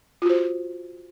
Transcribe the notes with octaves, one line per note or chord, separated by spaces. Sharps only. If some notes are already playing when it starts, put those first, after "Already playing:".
F4 F#4 C5